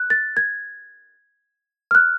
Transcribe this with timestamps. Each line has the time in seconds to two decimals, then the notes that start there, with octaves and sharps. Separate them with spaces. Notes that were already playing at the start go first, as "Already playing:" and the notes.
Already playing: F#6
0.10 A6
0.37 G#6
1.91 F6
1.95 F#6